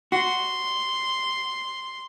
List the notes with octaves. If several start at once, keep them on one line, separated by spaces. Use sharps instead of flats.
F#4 C6